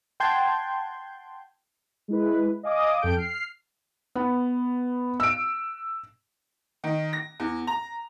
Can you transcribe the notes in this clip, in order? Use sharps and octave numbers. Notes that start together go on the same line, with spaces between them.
F#5 G5 A5 C6 G6 G#6
G#3 E4 B4
D#5 F5 G#5 D6 D#6
F2 A4 G5 G6 D7
F6 C7
B3
E6 D7
D#3
A#6
E2
A#5